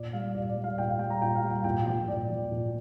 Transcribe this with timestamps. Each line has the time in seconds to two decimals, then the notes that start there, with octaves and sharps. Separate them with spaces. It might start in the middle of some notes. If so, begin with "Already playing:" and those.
Already playing: A#2 D5
0.13 G3 F5
0.35 A#2 D5
0.49 D5
0.57 G3
0.64 F5
0.78 A#2 G5
0.89 F5
0.99 G3 G5
1.10 A#5
1.22 A#2 G5
1.35 F5
1.43 G3
1.51 G5
1.64 A#2 G5
1.86 F3 G5
2.08 A#2 D5
2.30 F3
2.51 A#2